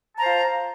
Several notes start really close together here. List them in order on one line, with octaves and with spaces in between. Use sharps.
A5 A#5 C5 F4